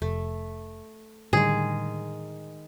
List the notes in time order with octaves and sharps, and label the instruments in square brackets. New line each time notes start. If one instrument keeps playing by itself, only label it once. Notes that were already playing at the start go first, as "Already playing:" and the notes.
[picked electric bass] F1 [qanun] A3
[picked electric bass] A2 D3 G3 [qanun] D#3 G#3 [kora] G#4